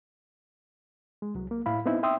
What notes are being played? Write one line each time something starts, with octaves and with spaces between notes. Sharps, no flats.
G#3
C2 F#3
A#3
A2 E4 F5 B5
B3 C4 D#4 E4
E5 G5 C6 D#6 E6